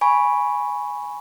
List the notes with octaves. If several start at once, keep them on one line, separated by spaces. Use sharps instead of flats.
G#5 B5 C#6